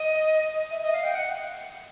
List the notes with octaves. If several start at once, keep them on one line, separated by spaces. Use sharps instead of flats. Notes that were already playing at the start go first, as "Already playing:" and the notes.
Already playing: D#5
E5
D#5
F5
G5
F#5